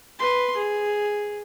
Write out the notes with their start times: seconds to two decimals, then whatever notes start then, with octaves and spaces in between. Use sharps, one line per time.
0.19 B4 C6
0.56 G#4